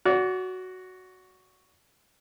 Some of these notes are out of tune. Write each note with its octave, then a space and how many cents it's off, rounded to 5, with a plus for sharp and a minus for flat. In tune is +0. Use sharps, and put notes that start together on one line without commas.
F#4 +0 D5 -35